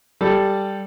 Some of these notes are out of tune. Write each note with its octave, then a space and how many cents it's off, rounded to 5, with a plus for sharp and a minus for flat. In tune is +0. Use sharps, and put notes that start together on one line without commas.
G3 +0 A4 +0